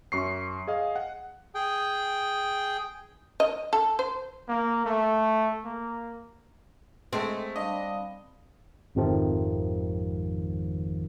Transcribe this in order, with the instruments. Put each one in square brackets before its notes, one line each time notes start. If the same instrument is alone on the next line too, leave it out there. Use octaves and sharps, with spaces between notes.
[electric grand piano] F#2 C#6 C7
G#4 D#5 F5
F#5
[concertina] G#4 G5
[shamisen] D#5
A4
C5
[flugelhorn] A#3
A3
A#3
[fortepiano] G#3 A3 [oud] C4 [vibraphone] D#5
[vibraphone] G3 F5 B5 [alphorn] D4 [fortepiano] D#5
[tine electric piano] G#1 F2 C3 D#3 F3